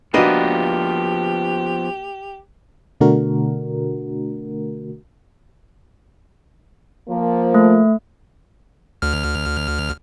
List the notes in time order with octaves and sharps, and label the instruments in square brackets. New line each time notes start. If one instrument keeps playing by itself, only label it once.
[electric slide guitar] F3 B3 [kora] A#3 B4 D#5 [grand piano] D4 F#4 [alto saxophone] G4
[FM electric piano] B2 D3 A3 D4 F#4 A#4
[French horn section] F3 A#3
[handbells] A3
[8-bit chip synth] D2 F6